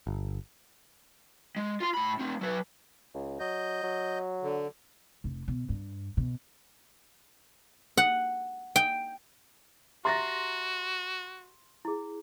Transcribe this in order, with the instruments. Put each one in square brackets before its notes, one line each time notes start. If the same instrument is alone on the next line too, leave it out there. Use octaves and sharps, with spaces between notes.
[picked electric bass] G1
[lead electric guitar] G#3
F4 C6
A2 B5
A3 C4
F#3 B4
[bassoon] C#2
[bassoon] F#3 [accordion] D#5 G6
[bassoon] F#3
[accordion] D3
[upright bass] F1
B2
G2
B2
[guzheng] F#5
G5
[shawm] F#4 [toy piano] G4 E5 A#5 [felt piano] C6 A6 A#6
[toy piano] E4 G#4